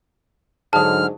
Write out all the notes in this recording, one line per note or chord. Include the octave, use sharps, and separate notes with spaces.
G#2 D3 F#3 G#3 A5 D#6 F6